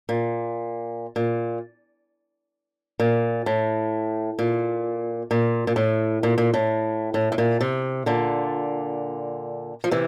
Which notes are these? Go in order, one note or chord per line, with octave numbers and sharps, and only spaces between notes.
A#2
A#2
A#2
A2
A#2
A#2
A#2
A2
A#2
A#2
A2
A2
A2
A#2
C3
A#2 D3
F3
C3 E3